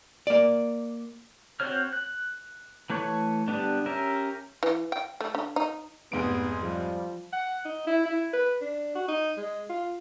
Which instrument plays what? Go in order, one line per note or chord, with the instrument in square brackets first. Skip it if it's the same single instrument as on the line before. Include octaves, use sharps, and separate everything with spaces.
[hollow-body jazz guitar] A#3 D5
[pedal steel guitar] C4 F#4 C5 C#5 F6
F#6
E3 A3 B4 C#5 C#6
D3 G3 B3 D4
C#4 G4 A#4 E5
[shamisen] E3
G5
A3
D3
D#4
[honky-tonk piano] F1 G#2 D7 [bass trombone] B3 [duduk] G#4
[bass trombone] F3 [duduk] G3
[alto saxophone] F#5
D#4
E4
E4
B4
D4
F#4
D#4
G#3
F4